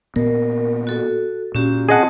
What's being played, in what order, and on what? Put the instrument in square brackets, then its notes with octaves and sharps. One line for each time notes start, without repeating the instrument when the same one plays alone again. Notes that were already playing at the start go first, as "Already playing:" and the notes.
[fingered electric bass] A#2 B3 [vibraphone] A#4
[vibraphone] F#4 A4
[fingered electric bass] A#2 [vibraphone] C#4 F#4 G4
[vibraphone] C4 A5 [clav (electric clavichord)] G#4 D#5 F#5